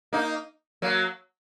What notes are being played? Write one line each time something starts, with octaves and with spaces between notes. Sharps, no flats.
A#3 D#4
F#3 A#3